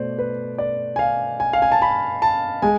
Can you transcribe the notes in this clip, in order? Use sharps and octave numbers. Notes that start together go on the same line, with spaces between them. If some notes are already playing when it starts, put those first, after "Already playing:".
Already playing: B2 A3 C5 D5
B4
D5
G#5
F5
G#5
F5
G#5
A5
B5
A5
G#3 G#5